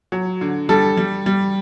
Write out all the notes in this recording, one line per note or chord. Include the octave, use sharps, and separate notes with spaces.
F#3
D3
G3 A4
G3
G3